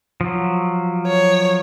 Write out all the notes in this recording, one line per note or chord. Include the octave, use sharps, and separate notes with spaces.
F3 F#3
C#5